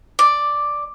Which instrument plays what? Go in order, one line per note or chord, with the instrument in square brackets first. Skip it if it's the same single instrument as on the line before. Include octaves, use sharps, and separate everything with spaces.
[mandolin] D5